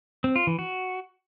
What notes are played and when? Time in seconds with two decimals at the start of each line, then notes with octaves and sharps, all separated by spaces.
0.24 C4
0.36 F4
0.47 E3
0.59 F#4